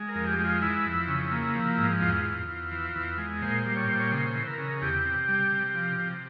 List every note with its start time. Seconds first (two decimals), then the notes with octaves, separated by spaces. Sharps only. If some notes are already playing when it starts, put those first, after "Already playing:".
Already playing: G#3
0.09 A#4
0.15 F2
0.27 G4
0.39 G#3
0.44 F4
0.62 E3 E4
0.85 F2
1.08 C#3
1.31 A#3
1.55 F3
1.78 G#2
2.01 E2 F4
2.25 E2
2.48 E2
2.71 E3
2.96 E2
3.18 G#3
3.41 A#2 C5
3.66 G3
3.76 C#5
3.88 A#2 C5
3.99 C#5
4.11 C#3 C5
4.35 E3
4.47 A#4
4.58 C#3
4.82 E2 G4
5.05 C3
5.28 G3
5.52 C3
5.74 F3
5.98 C3